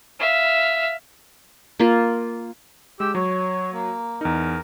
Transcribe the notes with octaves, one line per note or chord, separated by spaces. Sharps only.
E5 F5
A#3 F4
G#3 G4 E6
F#3 C#5
A#3
E2 D#4 A#4